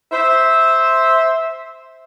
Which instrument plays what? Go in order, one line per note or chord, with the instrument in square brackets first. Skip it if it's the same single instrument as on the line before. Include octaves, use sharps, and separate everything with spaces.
[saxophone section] C5 E5